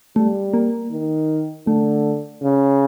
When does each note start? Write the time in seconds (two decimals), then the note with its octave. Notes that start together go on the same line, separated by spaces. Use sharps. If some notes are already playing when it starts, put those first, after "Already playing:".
0.16 G3 A3
0.54 A#3
0.91 D#3
1.66 D3 A3
2.42 C#3